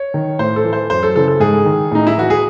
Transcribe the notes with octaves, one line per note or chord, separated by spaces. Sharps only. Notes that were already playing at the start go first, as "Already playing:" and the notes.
Already playing: C#5
D#3
A2 C5
A4
E3
C5
F#2 C5
A4
C#3 E3 A4
A4
G#2 G#4
D#3
A2 D#4
E4
E3 F#4
G#4